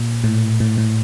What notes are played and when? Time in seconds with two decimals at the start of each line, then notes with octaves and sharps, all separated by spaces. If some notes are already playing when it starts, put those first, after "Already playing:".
Already playing: A#2
0.24 A2
0.60 A2
0.77 A2